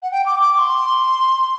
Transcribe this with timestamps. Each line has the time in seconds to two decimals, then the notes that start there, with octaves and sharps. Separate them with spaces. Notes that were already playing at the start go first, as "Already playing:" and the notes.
0.02 F#5
0.11 G5
0.25 D6
0.39 D6
0.53 D6
0.58 C6